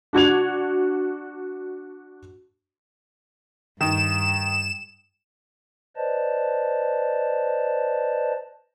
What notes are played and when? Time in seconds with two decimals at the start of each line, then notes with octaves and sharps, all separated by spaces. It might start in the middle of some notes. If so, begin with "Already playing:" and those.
0.13 D4 F#4 G#6 F7
3.81 G2 D#3 E7
5.96 B4 C5 D5 D#5 A5